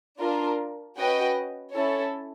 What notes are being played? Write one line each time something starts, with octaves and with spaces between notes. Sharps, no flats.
D4 F4 A#4
C#4 F#4 B4 D#5 G5
C#4 E4 A4 C#5